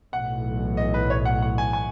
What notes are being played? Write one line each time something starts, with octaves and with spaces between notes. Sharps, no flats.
B1 A2 E3 F#5
D#5
B4
C#5
F#5
F#5
G#5
G#5